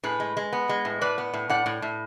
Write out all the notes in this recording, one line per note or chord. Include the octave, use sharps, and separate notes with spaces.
A2 G#4 B4
G#3
G#3
B3
G#3
A2
A2 B4 D5
B3
A2
A2 D5 F#5
A2
A2